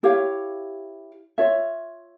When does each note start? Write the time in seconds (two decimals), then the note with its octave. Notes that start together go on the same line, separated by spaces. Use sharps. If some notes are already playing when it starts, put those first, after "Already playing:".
0.03 E4 G4 C#5 F5
1.38 F4 C#5 E5